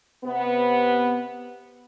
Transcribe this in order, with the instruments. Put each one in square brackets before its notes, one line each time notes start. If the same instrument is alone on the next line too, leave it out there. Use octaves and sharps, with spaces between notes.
[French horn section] C3 B3